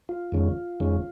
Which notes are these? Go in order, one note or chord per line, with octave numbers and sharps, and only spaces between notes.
F4
F2 D#3 G#3 C#4
F2 D#3 G#3 C#4